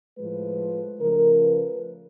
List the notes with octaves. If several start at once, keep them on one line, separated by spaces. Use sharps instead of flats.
A2 F3 G#3 B4
C#3 F3 A3 A#4
B4